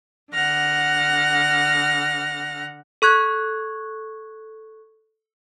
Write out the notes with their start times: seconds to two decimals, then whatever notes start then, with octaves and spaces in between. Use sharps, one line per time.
0.33 D3 F#5 F6 A#6
3.02 A4 C#6 F#6 G#6